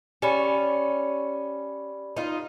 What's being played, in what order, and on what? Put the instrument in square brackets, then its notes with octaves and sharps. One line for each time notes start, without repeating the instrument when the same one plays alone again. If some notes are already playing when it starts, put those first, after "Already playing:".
[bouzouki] C#4 [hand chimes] G4 D5 B5
[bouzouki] D#4 F4